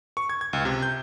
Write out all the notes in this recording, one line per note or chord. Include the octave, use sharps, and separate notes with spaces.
C#6
G#6
G#6
C#2
C3
G6